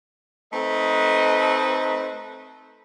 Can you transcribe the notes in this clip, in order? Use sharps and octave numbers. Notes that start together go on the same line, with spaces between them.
A3 C4 D#4 A4 B4 D#5